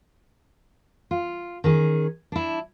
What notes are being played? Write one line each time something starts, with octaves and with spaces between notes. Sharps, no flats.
F4
D#3 C#4 G#4
D4 E4